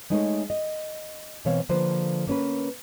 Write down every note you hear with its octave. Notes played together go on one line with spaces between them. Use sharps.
G#3 A3 D#4 A4 C5 C#5
D#5
B2 E3 C4 C#5 F5
D3 F3 A#3 B4 C5
A#3 C#4 B4